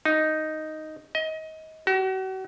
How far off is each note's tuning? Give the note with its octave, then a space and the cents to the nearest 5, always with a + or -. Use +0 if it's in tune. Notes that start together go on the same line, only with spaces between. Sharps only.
D#4 +0
D#5 +25
F#4 +40